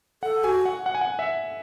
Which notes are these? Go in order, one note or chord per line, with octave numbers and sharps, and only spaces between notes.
A4 F#5
F#4 G#5
F#5
F#5
G#5
F#5
E5